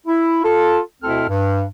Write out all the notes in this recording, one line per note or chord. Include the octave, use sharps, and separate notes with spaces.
E4
F4 A4
D2 B2 C4 E4 A4 F6
G2